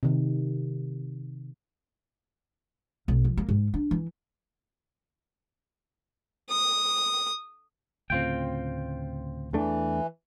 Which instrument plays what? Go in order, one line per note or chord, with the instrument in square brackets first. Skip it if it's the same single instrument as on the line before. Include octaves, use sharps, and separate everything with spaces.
[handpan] C3 D#3
[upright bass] B1
F2
A#3
G#2
D4
E3
[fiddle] D#6
[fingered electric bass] D2 A2 C#3 [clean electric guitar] C4 F4 G5
[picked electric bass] E2 A3 D4 [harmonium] E3